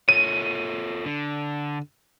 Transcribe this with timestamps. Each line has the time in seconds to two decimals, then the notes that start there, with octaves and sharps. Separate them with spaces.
0.09 F4 A4 C#5 D#7
1.06 D3